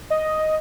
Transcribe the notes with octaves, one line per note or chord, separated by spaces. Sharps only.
D#5